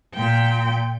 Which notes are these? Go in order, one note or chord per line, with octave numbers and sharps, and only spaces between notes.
A#2 G5